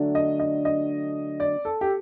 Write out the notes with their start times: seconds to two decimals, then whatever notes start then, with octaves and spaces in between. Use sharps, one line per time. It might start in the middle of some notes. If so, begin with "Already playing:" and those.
Already playing: D3 F#3 A3 D4
0.15 D#5
0.40 D#5
0.65 D#5
1.40 D5
1.65 A4
1.81 G4